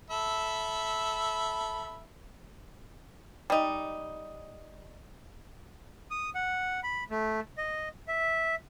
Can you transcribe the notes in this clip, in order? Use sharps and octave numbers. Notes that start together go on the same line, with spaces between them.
A4 E5 B5
G3 D#4
D#6
F#5
B5
A3
D#5
E5